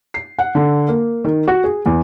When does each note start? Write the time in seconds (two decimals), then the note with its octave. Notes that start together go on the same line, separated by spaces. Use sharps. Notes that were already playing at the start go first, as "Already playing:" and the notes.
0.14 C7
0.39 F#5
0.55 D3
0.88 A#3
1.25 D#3
1.48 F#4
1.64 G#4
1.86 E2